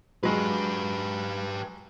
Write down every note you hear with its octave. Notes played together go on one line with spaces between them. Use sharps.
F#3 G#3 G4 B4